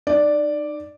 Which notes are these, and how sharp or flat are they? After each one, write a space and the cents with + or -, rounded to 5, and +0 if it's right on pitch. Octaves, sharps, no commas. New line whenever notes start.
D#4 -30 D5 +0